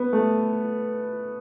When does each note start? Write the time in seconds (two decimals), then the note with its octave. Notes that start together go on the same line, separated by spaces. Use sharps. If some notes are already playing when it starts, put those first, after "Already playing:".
Already playing: B3
0.13 A3